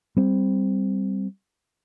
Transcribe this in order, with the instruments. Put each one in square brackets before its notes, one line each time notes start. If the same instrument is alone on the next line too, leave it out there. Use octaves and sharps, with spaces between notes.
[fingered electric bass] G3 C4